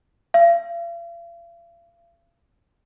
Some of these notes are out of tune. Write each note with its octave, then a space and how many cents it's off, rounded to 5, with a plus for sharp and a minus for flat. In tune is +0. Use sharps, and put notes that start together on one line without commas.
F5 -45